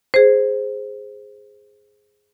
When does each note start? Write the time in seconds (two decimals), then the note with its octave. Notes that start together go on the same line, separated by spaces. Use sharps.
0.14 G#4 C5